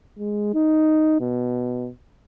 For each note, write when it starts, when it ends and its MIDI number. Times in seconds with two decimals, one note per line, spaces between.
0.19 0.53 56
0.54 1.17 63
1.20 1.89 47